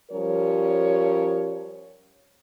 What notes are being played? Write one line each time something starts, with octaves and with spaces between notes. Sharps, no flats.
F3 G3 C#4 A#4 C#5